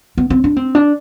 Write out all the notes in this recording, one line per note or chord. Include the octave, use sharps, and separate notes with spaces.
B3
C4
D4
C4
D4